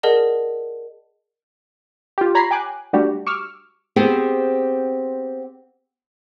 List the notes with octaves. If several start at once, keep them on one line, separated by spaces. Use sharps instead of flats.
G#4 A#4 D5 D#5 F#5 A5
F4 G4
C#5 A#5 B5 G#6 B6 C7
G5 G#5 D6 F#6
G3 A3 D4 F#4 G4
C#6 D6 E6 F6
B3 C4 G4 G#4 C5